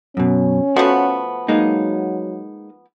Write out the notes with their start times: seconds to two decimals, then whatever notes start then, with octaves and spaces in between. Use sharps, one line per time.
0.17 F#2 B2 C#4
0.76 F3 A3 B3 F#4
1.48 F#3 G#3 A#3 D#4